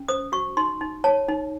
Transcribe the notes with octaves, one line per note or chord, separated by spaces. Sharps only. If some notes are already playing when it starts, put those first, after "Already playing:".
Already playing: C#4
C5 D#6
F#4 C#6
D#4 C6
D#4
C#5 A5
D#4